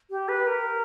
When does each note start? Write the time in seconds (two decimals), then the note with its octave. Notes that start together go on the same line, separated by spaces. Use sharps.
0.10 G4
0.29 B4
0.47 A#4